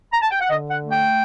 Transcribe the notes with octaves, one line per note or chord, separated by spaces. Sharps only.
A#5
A5
G5
F#5
D3 D#5
F#5
A3
G5